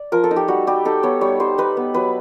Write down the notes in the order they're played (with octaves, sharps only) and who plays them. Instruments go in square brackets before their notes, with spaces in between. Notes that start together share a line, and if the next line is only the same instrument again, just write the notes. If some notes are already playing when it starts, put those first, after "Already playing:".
Already playing: [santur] D5
F3 A#4
A4
D#4
G4
G3 F#4
G3 G4
D#4 A4
B3 C#5
G3 C#5
G3 C5
D#4 B4
B3
F#3 B4